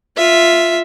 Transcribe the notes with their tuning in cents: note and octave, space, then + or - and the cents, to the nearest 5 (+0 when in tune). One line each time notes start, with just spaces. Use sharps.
F4 +0 E5 +0